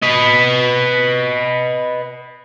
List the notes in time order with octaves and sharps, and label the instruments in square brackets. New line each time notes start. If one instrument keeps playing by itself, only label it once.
[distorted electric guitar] B4 D#5